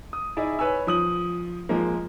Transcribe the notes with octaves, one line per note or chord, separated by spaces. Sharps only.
D#6
D#4 E4 G#4 D5 E5
B4 C#5 G#5 E6
F3 D#6 F#7
F3 G#3 A#3